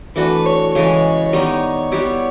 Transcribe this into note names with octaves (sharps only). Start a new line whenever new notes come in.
E3 A3 D4 F#4 B4
C#5
C#3 E3 G#3 C#5
D#3 G3 B3 D#4 C#5
G3 B3 E4 G4